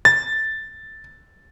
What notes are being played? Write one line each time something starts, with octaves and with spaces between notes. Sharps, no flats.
A6